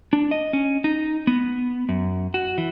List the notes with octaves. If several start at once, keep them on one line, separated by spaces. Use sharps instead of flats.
D4
D#5
C#4
D#4
B3
F#2
F#4
E3